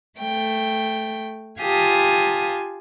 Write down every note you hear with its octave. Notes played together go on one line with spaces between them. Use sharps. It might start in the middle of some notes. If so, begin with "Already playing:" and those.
A3 G5
F4 G4 F5 G#5 A5 D#6